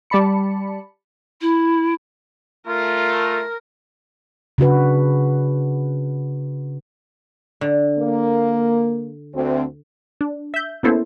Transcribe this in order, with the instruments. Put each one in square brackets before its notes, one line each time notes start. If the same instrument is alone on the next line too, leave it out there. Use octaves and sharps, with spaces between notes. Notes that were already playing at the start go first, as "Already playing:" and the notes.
[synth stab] G3 D5 A5 B5 C#7
[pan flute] E4
[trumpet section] A3 F4 [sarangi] A#4
[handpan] C#3 D4 F#4 B4
[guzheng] D3
[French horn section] A#3
D2 C4
[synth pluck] D4
E5 G6
A#3 B3 C#4 E4 A4 C5